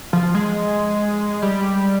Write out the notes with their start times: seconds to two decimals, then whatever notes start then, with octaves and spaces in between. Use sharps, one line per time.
0.13 F3
0.35 G#3
1.42 G3